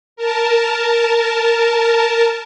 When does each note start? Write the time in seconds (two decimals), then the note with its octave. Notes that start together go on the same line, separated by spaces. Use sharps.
0.16 A#4 A5